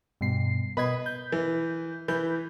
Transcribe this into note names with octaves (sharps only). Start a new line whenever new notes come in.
G2 B2 C7
B2 B4 D#5 G#6
G6
E3
E3 B5 G6